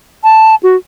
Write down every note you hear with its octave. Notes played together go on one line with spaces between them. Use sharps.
A5
F#4